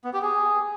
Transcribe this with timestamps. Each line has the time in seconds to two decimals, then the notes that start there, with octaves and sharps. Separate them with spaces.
0.04 B3
0.13 G4
0.22 G#4